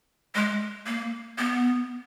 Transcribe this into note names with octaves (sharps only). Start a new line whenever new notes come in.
G#3
A#3
B3